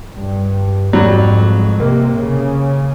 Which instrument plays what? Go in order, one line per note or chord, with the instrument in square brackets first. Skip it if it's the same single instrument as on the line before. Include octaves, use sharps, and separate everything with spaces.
[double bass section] G2
[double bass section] F2 G#2 [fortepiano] F#3 G3
[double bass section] C3 [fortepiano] A#3
[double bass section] C#3